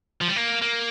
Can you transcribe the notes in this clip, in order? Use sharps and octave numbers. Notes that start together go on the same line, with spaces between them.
F3
G3
A#3
A#3